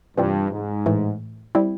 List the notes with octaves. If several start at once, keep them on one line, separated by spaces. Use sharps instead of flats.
G2 C3 E3 G3 C4 F4
G#2
A2 E3 A3
G3 C4 E4